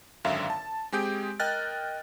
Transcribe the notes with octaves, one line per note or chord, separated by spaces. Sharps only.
G#1 F#2 D3 E5 F5
A5
G#3 C4 G4 G#4 G6 D7
A#4 D#5 G5 F6 F#6 A6